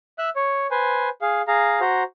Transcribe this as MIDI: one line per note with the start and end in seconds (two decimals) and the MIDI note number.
0.19 0.30 76
0.19 0.30 88
0.19 0.30 90
0.36 0.67 73
0.71 1.09 71
0.71 1.09 72
0.71 1.09 80
1.22 1.42 68
1.22 1.42 77
1.48 1.80 68
1.48 1.80 77
1.48 1.80 82
1.81 2.03 66
1.81 2.03 72
1.81 2.03 82